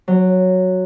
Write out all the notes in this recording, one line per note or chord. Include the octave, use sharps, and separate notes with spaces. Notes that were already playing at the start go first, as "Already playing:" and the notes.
F#3